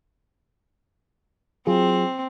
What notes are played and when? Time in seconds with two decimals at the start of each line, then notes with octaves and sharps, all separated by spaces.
1.67 F#3 C4 F4 G#4